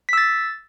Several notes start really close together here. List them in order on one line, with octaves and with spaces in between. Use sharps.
B6 E6 A6